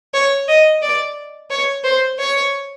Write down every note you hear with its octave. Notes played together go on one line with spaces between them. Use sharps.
C#5
D#5
D5
C#5
C5
C#5